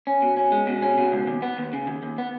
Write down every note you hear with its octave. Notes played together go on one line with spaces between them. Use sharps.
C#4
B2
C#4
G#3
B2
C#4
B2
C#2
D#2
B3
D#2
C#3
D#2
D#2
B3